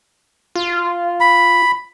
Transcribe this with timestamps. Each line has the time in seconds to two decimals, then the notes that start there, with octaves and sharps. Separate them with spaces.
0.56 F4
1.20 B5